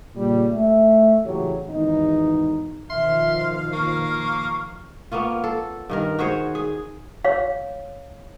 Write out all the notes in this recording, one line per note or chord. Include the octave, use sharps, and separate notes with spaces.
A#2 C#3 G3
A3 E5
A1 A2 C#3 F#3 G4 C#5
G#1 E2 B3 D#4
B2 D#3 F3 E5 F5 C6
A#3 C#6
A#3 B3 C#4 F4
A4
G2 D#3 A#4
F#4 G#4 C5 C#5
G#4
C#5 F5